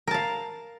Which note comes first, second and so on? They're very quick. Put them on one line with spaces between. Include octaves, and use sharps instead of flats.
A#4 A5 F5